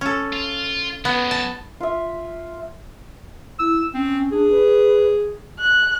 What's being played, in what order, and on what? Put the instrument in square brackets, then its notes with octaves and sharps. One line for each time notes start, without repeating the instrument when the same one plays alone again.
[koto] C#4 A4
[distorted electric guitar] F4
[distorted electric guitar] F#3 G#3 [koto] B3
[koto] A5
[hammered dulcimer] F4 E5
[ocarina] E4 [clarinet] E6
[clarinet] C4 [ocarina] C#4
[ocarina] D4 [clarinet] G#4
[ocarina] B4
[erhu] F#6